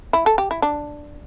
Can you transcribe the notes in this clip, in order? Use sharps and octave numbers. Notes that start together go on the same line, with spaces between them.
E4
A4
G4
E4
D4